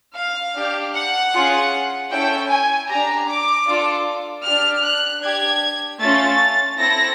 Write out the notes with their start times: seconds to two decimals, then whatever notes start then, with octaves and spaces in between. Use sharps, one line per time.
0.16 F5
0.55 D4 G4
0.94 F#5
1.33 C#4 F4 G#4
2.10 C#4 E4 A4 G5
2.50 G#5
2.88 D4 G4 A#5
3.28 D6
3.67 D4 F4 A4
4.44 D4 G4 F6
4.83 F#6
5.22 D4 G4 G#6
6.00 A3 C#4 F4 A6
6.78 C4 E4 A4 A#6